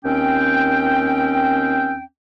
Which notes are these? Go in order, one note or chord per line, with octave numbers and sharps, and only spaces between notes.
D#2 C4 C#4 G5